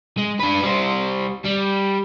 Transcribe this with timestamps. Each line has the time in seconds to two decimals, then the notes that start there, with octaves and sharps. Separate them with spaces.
0.18 G#3
0.40 D4 B4
0.63 G3 C5
1.45 G3